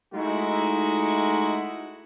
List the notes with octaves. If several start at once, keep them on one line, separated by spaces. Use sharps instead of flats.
G#3 A3 D#4 E4 F#4